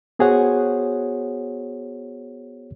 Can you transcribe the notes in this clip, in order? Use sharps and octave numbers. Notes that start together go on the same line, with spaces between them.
B3 F#4 G#4 C5 C#5 F#5